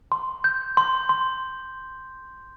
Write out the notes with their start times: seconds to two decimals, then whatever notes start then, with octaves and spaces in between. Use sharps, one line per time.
0.12 C6
0.44 G6
0.77 C6
1.09 C6